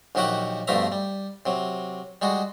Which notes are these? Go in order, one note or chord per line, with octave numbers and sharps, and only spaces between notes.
A#1 D#3 F#3 F#4 G4 F#5
G2 B2 F3 A3 E5 A#5
G3
C3 F#3
G3 G#3 F#4